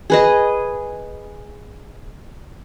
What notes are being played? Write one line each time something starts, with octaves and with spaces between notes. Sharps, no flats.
G#4 B4 D#5